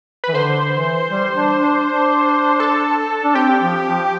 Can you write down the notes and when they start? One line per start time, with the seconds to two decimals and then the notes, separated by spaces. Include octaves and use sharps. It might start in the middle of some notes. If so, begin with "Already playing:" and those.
0.24 E3 B4
0.34 D3 C5
0.71 E3
1.09 G3
1.35 D4
1.60 D4
1.85 D4
2.60 A4
3.24 D4
3.35 C4 G4
3.61 F3
3.86 F3